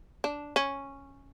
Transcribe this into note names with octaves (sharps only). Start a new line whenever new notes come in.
D4
C#4